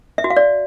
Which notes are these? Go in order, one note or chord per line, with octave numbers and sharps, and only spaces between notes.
E5
F#4
F5
D5